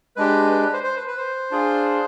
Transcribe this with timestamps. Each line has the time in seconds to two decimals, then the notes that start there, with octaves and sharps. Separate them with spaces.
0.16 G#3 D4 G4 B4
0.51 B4
0.61 B4
0.73 C5
0.84 C5
0.96 B4
1.07 B4
1.17 C5
1.51 D4 F4 G#4